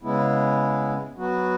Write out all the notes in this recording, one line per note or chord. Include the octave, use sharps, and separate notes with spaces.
C#3 G#3 B3 E4
F#3 B3 F#4